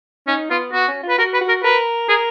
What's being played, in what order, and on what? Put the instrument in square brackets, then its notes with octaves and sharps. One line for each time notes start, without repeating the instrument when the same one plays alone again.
[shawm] C#4 [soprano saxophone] D#4
[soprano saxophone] B3 [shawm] F4
[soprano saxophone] B3 [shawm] F#4
[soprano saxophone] C#4
F4
[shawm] B4
[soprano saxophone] F#4 [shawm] A#4
[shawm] B4
[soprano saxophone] F#4
[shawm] A#4
[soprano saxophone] A#4 [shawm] B4
[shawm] G#4 [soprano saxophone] A#4